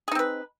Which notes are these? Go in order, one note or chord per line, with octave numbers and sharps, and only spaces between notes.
C4 D#4 G#4 B4